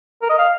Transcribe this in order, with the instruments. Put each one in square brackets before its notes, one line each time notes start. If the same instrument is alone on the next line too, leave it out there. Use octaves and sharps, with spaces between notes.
[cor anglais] A#4
D#5
F5